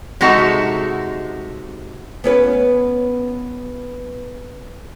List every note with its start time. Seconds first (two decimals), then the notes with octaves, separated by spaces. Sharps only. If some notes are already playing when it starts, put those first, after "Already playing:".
0.21 C3 G#3 D#4 F#4 A4
2.24 B3 C#4 B4